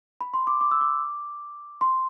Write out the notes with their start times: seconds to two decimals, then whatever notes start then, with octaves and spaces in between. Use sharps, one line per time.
0.21 B5
0.34 C6
0.47 D6
0.61 D6
0.71 E6
0.81 D6
1.81 C6